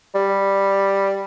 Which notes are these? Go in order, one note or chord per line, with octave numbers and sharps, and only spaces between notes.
G3